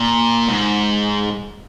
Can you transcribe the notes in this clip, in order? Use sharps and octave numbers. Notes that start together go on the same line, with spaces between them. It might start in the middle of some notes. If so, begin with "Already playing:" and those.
Already playing: A#2
G#2